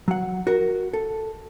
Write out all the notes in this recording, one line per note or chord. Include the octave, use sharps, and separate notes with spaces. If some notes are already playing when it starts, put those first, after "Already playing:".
F#3 F#5
F#4 A#4
A4